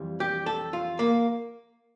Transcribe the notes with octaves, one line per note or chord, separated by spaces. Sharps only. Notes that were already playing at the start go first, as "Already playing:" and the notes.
Already playing: F2 E3 G3
G4
A4
F4
A#3